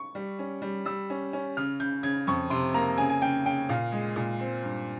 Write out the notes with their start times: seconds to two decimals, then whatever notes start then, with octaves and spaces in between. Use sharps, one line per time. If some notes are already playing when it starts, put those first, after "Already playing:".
Already playing: C#6
0.15 G3
0.39 C#4
0.62 G3
0.85 G3 E6
1.10 C#4
1.33 C#4
1.57 C#3 F6
1.80 C#3 G6
2.03 C#3 G#6
2.27 F2 C#6
2.50 C3 C6
2.74 A#3 A#5
2.97 C#3 G#5
3.10 G#5
3.21 C#3 G5
3.46 C#3 G5
3.69 A#2 F5
3.92 G#3
4.16 A#2
4.40 C4
4.62 G2